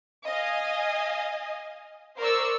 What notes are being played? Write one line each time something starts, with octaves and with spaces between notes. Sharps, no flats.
D#5 F5 G#5
A#4 C5 D5 C#6 E6